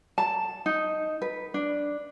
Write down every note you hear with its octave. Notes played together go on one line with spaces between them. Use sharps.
A5
D#4
B4
D4